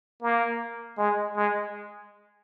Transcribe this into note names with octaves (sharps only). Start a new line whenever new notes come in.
A#3
G#3
G#3